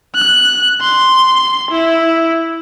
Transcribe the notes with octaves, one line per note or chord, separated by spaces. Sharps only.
F#6
C6
E4